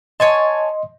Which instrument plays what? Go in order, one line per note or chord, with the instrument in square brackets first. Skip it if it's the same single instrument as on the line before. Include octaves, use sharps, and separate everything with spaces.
[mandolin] C#5 G#5 A5 [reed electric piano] D#5 C6